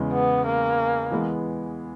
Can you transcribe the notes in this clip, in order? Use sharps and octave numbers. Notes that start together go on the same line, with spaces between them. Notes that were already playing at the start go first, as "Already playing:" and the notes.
Already playing: E2 C#3 G#3
B3
A#3
E3 G#3 B3